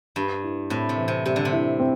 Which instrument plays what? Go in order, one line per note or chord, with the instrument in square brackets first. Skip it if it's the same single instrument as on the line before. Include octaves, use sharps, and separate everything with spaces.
[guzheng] G2 [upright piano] G3
[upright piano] E4
[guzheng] A2 [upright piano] C4
[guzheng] C3
[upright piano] E3
[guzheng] C3
[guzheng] C3 [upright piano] G3
[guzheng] D3
C3
[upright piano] E4
C4